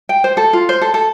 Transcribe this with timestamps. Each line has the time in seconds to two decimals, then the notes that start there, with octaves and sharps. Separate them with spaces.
0.09 G5
0.24 C5
0.37 A4
0.53 F4
0.69 C5
0.81 A4
0.94 A4